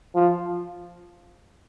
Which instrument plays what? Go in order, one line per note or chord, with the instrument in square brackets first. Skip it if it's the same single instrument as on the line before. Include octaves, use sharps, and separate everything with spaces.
[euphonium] F3